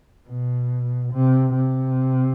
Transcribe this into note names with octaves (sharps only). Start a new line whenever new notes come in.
B2
C3
C3